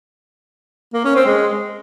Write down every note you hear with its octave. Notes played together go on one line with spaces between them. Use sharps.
A#3
C#4
C4
G#3